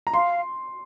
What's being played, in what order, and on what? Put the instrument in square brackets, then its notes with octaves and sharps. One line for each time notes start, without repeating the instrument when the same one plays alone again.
[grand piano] A#5
[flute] F5 [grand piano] C6